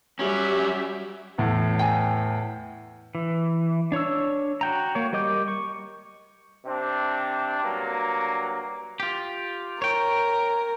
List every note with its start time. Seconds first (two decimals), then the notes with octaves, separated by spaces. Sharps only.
0.19 F#3 G3 C#4 G4 E5
1.38 E2 A2
1.79 G5 G#5
3.15 E3
3.92 D4 C#5 C#6 E6
4.61 F#4 G5 A#5
4.95 A#3 C#5
5.13 G3 A#4 D#5 D6 G6
5.48 C#6
6.65 C3 C4 D4
7.64 G2 F#3 A#3
9.00 F4 G4
9.82 A#4 C#5 G5